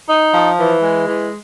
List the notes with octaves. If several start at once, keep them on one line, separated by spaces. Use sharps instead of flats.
D#4
F3
E3
G#3
E3